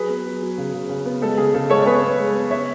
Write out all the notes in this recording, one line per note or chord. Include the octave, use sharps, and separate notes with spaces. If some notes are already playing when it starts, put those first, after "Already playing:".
Already playing: F#3 G#4 B4
B3
F#3
F#3
C#3
C#3
C#3
B3
G#3 A4
C#3 G#4
C#3 A4
G#3 A4 C#5
C#5
B3 G#4 B4
B3
G#3
B3
C#3 C#5 E5